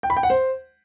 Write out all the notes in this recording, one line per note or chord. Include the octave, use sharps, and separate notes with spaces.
G5
B5
G5
F#5
C5